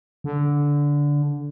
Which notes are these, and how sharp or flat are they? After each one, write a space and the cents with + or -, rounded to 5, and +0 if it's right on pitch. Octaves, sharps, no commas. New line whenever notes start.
D3 -15